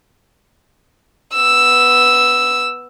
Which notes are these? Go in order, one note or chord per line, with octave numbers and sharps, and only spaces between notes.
B3 E6